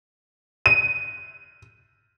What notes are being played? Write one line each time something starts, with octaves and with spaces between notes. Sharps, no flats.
D#7